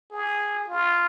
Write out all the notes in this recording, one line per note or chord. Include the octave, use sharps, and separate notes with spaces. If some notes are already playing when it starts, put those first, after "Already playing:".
G#4
F4